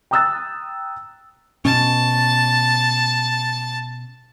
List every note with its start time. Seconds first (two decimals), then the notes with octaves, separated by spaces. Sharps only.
0.11 G5 A#5 D#6 E6 F#6 A6
1.65 B2 C#4 A5